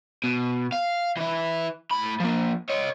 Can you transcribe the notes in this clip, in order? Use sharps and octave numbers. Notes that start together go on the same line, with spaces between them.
B2
F5
E3 E4
A2 B5
F3 A#3
C#5 D#5